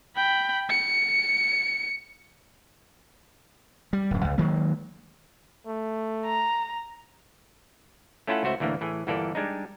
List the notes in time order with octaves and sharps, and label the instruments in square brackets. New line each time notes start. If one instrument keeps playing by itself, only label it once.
[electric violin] G5 B5
C#7
[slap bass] G3
D1 F#2
C#2
D#3 F#3 G#3 A#3
[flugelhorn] A3
[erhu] A#5
[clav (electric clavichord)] A3 C#4 E4 F4 A4 F#5
C#2 A3 F#4 C5 E5
D2 A2 E3 A#3 D4
A2 E3 G#4
G1 A#2 E3 A#3 A4 D5
G3 G#3 D4 D#4